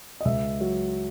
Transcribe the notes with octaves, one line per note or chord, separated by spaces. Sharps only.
D#5
C#2 E5
F#3